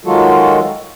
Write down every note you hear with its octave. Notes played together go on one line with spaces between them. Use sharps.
D#3 F#3 G#3 F4 F#4 A4